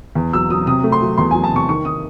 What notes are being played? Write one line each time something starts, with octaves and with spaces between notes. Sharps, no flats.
E2
F#3 E6
F#3 D#6
C3 D#6
A3
C6
F#3
E2 C6
F#3 G#5
A5
C3 C#6
D#3 C#6
D#3 D#6